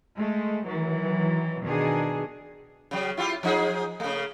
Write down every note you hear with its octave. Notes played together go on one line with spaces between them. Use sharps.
G#3 A3
D#3 E3 F#3
B2 D#3 D4 G#4
C#3 F#3
E4 F4 G4
F3 D#4 G#4
C#3 A3